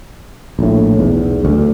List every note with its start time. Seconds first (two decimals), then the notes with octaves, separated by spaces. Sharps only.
0.59 A#1 A2
0.97 B1 E2
1.45 D2